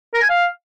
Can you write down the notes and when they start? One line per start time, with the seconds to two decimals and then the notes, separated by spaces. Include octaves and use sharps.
0.14 A#4
0.22 G#5
0.30 F5